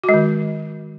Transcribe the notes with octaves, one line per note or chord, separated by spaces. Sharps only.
F#4
G#3
D#3